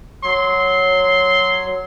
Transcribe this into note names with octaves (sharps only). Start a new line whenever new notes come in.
F#3 C6